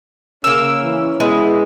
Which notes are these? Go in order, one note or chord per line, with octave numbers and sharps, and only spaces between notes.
C#3 A#3 C#4 A#4 E6
E3
G#3 B3 E4